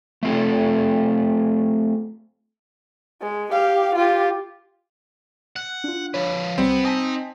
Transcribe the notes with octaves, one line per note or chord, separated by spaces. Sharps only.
A3 C4 F4 A4
G#3
G4 F5
F4 G4
F#5
D4 F4
F3 B4 C#5
C2 G3 B3 C4
D#4 D#5 G#5 A5 B6